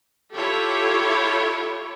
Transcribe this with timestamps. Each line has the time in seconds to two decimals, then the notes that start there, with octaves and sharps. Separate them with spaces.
0.34 E4 F4 G4 A4 C#5